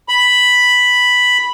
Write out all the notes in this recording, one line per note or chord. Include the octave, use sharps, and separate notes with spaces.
B5